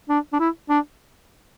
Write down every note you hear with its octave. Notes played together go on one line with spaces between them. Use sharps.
D4
D4
E4
D4